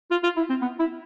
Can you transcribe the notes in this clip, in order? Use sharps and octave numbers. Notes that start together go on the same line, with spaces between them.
F4
F4
E4
C4
B3
E4